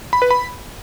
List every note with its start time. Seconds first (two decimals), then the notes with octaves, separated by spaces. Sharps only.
0.13 B5
0.22 B4
0.31 B5